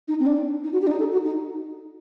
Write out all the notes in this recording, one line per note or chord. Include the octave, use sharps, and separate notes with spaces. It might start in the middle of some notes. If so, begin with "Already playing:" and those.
D#4
C4
D4
D#4
F#4
G4
D4
D#4
A4
F#4
D#4